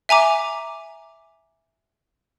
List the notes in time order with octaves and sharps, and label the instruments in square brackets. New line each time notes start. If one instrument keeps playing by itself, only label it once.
[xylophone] E5 G#5 A#5 D6